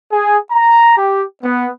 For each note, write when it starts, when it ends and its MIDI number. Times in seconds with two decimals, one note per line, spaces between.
0.11 0.36 68
0.50 0.93 82
0.96 1.24 67
1.43 1.67 59